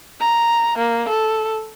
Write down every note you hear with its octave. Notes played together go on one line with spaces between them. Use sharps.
A#5
A#3
A4